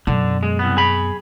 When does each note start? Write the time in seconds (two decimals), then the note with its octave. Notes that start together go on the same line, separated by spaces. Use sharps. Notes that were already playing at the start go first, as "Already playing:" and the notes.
0.07 F#2 B2 D3
0.43 G#3
0.59 C2 B3
0.77 G#4 B5